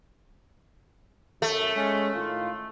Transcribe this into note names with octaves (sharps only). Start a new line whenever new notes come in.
F#2 A3
G#3 C#4
A2 D#3 F4